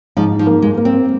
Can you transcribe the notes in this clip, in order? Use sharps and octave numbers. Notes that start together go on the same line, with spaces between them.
G#2 F3
F3
A#3
G#3
A#3
C4